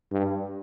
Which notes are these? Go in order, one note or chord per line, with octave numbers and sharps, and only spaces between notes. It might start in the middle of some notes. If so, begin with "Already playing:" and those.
G2